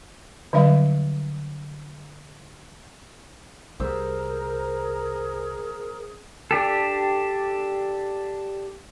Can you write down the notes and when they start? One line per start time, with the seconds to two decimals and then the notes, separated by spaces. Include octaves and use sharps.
0.53 D3 F#3 G3 D4 E5 F5
3.80 C2 G3 G#4 A#4 C5 E6
6.51 D4 G4 A4